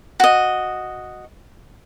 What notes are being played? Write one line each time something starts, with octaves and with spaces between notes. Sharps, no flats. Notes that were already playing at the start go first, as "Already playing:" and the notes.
F#4 D#5